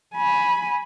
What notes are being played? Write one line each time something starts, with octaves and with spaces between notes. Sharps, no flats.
G#5 B5